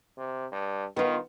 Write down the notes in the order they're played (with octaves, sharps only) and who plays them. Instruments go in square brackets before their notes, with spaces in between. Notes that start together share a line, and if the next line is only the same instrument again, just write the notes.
[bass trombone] C3
G2
[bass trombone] D#3 [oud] B3 F4